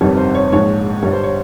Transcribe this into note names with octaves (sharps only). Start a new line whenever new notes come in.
G1 F2 C3 D#3 G3 C#5
C5
C#5
A#1 G#2 F3 G#3 C#5
G1 G2 G3 C#5
C5
C#5